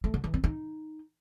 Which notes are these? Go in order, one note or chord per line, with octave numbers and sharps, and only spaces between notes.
A3
D3
E3
C4
D#4